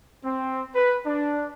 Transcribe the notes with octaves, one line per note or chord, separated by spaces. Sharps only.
C4
B4
D4